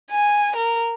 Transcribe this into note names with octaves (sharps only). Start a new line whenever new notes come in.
G#5
A#4